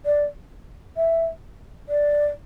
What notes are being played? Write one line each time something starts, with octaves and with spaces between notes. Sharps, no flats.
D5
E5
D5